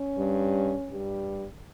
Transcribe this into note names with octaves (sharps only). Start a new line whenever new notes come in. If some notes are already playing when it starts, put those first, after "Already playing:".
Already playing: C#4
G2 G3
G2 G3